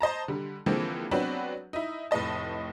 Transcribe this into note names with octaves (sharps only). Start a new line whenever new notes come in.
C5 D#5 A5 A#5
D3 G3
D3 E3 F3 G#3 A#3 C4
F#3 B3 C4 D4 F#4 B4
D#4 E4
F1 A2 B4 D#5 A5